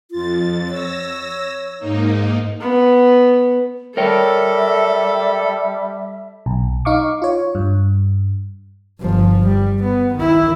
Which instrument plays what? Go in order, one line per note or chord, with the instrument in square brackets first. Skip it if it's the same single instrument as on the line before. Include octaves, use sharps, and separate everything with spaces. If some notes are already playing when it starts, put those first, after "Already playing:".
[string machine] F2 A6 [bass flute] F4
[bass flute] C#5 [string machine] E6 A#6
[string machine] G#2 A#3 D#4
[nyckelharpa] B3
[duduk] G3 [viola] A4 [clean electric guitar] A#4 C#5 G5 [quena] E5
[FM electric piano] B1
D#4 F5 C#6 D6
F4 C#5
G2
[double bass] G1 F3
G3
B3
D#3 E4